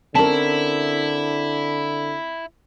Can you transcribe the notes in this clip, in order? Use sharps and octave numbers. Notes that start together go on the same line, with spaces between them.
D3 C4 C#4 E4 A#4 A5